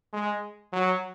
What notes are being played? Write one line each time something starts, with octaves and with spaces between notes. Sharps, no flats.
G#3
F#3